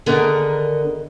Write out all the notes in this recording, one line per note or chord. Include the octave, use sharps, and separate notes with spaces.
D3 D#3 B3 G#4 A#4